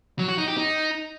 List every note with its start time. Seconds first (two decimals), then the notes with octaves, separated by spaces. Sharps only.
0.19 F#3
0.28 F#4
0.38 D#4
0.48 G4
0.57 D#4